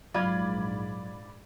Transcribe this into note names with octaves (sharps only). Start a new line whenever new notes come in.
A#1 G#2 F#3 F4 D5 B5 G#6